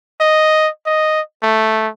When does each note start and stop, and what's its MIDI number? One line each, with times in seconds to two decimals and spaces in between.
0.21 0.69 75
0.86 1.21 75
1.43 1.88 57